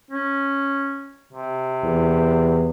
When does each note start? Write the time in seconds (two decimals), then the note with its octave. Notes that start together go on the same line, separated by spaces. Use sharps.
0.11 C#4
1.33 C3
1.84 E2